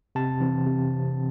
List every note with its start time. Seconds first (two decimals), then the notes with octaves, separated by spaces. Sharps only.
0.15 C3 A5
0.40 E3 C4
0.67 C3